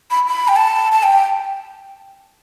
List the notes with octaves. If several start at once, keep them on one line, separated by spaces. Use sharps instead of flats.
B5
B5
G5
A5
A5
G5